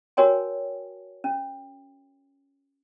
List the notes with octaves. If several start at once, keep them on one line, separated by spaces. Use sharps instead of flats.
F#4 A#4 C#5 G5 G#5
C#4